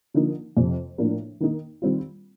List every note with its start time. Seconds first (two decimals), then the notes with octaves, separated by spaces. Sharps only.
0.14 D3 F3 A#3 D#4
0.57 F2 C3 F3
0.98 A2 F3 A#3 D4
1.40 D#3 A#3 D#4
1.82 D#3 G3 C4 F4